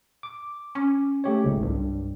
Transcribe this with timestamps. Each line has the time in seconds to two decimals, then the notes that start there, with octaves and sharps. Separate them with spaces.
0.23 D6
0.75 C#4
1.24 A3 G4 C#5
1.44 F#1 C#2 G#2
1.63 C2 G2